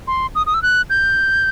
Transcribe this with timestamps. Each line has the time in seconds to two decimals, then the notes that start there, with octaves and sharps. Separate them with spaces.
0.07 C6
0.35 D#6
0.47 D#6
0.54 E6
0.63 F#6
0.90 G6